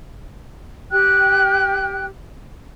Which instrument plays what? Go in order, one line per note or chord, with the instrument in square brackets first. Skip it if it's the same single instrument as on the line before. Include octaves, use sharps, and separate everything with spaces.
[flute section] G4 G5 F#6